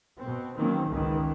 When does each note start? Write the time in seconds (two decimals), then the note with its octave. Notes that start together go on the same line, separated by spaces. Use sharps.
0.21 B2 C4
0.55 D#3 E3 F#3 A#3 C4 C#4
0.89 G#1 C#2 D#3 E3